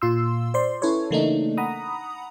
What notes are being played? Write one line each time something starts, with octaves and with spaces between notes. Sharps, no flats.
A#2 F4 C6 E6
C5 D5 C6
C#4 E4 A4 B4 C#5
C#3 E3 A3 A#3 D4 D#4
F#5 A#5 B5 D#6